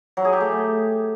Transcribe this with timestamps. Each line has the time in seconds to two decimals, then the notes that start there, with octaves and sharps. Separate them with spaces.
0.17 F#3
0.25 G#4
0.33 G4
0.41 A3